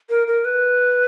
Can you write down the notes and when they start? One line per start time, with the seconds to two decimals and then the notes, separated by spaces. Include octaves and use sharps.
0.10 A#4
0.27 A#4
0.45 B4